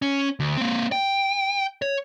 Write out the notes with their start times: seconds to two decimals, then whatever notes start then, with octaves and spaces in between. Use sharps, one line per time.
0.02 C#4
0.40 D2
0.57 A#3 C4
0.92 G5
1.82 C#5